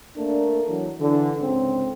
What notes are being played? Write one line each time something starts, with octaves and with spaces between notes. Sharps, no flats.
A3 A#3 D4
E3 F#3
D3 E3
C#2 G#2 D3 C4